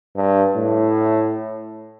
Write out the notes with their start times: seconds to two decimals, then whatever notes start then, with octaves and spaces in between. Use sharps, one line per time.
0.16 G2
0.56 A2